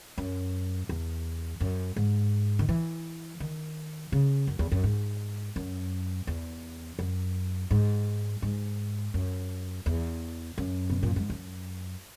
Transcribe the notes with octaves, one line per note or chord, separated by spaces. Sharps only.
F#2
E2
F#2
G#2
D#3
E3
D#3
C#3
F#2
E2
F#2
G#2
F#2
E2
F#2
G#2
G#2
F#2
E2
F#2
B2
A#2
G#2
F#2